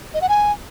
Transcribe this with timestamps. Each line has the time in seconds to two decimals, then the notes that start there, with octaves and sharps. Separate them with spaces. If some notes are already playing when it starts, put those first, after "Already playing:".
0.14 D#5
0.22 F#5
0.29 G#5